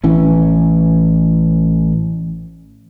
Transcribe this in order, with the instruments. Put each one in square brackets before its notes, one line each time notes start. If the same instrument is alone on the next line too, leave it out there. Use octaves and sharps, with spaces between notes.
[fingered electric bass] A1 E3 C#4